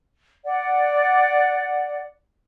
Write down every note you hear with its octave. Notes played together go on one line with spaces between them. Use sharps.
D5 F#5